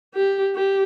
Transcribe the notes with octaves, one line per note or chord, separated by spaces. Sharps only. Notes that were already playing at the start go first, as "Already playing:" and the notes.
G4
G4